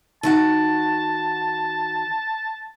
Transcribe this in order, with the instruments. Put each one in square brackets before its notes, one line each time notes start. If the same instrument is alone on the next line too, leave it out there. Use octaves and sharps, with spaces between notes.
[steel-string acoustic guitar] D#3 F#4 F#5 [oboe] A5